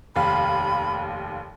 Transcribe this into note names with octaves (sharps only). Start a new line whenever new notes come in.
F1 D#2 F5 B5